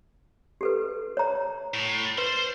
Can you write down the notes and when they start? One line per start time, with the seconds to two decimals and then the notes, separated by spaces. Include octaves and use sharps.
0.61 G4 A4 B4
1.17 C#5 A#5
1.74 A2
2.18 B4 C5 C6